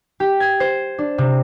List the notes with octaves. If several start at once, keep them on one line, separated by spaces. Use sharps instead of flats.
G4
G#6
C5
D4
C3